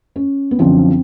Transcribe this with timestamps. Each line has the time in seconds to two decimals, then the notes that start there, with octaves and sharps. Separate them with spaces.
0.16 C#4
0.51 B3
0.59 F#2 D3 F3 C4